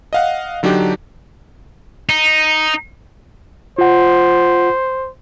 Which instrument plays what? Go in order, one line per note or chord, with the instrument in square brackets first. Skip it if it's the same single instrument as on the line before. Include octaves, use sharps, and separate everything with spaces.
[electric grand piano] D#5 F5 F#5
D3 F#3 D4 D#4 G4
[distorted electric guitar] D#4
[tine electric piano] F4 F#5 [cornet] C5